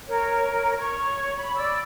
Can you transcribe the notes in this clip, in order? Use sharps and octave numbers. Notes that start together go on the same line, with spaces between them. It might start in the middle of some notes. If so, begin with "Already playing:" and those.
A#4 C#5
C#5 C#6
B5
D5 E6